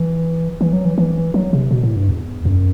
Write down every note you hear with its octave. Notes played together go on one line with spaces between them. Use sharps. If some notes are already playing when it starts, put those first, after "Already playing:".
Already playing: E3
E3
F#3
E3
E3
F#3
C3
B2
A2
G2
E2
F#2